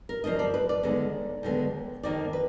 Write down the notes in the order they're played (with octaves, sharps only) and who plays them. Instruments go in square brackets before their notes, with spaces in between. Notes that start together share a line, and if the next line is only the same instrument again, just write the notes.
[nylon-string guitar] A#4
D2 D3 F3 A#3 D#5
D5
B4
D5
D#2 D3 G#3 B3
D#2 D3 G#3 B3
F2 D#3 A#3 D5
B4